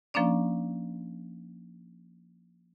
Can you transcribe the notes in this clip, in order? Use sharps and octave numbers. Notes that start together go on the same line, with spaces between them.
F3 A#3 C#4 D4 D5